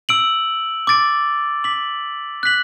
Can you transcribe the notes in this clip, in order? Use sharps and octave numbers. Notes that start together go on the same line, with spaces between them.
E6 D7 F#7
D6 A6 D7
D6 B6 F#7
F#6 B6 F#7